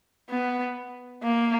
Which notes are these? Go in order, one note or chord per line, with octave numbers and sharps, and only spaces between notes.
B3
A#3